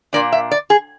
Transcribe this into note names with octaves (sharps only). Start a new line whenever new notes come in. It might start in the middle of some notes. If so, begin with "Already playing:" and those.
A#2 F3 A#3 D4 D5
E5
D5
G#4